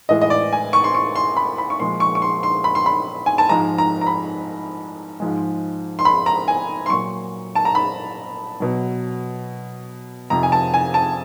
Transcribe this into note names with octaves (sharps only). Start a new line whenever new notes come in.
A2 E3 G#3 D#5
D#5
D5
G#5
C#6
C6
C#6
C6
B5
B5
C#6
A#2 F3 G#3 C6
C#6
C#6
C6
C6
B5
C6
B5
G#5
A5
G#2 F3 G#3 A#5
A#5
A#5
B5
G#2 F3 G#3
C6
B5
A#5
G#5
C6
A#2 F#3 C#6
A5
A#5
B5
B2 F#3
F2 C3 F3 A#5
G#5
A5
G#5
A5